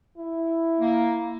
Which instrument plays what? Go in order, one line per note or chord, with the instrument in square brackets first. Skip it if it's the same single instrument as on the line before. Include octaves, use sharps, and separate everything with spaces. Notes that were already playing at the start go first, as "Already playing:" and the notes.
[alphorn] E4
[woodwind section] A#3